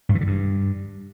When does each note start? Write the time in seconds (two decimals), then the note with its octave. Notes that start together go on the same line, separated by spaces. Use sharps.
0.09 G2
0.15 E3
0.21 D3
0.27 G2